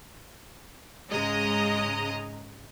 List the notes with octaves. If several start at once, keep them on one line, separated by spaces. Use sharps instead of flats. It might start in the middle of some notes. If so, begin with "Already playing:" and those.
G#2 C#3 G#3 D#5 A#5 D#6